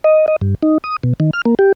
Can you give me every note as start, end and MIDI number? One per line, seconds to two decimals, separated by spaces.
0.04 0.26 75
0.28 0.36 75
0.41 0.55 43
0.63 0.78 63
0.84 0.96 87
1.03 1.14 47
1.20 1.31 51
1.33 1.42 89
1.45 1.55 58
1.59 1.72 67